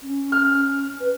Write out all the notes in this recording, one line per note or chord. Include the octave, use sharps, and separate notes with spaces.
C#4
F6
B4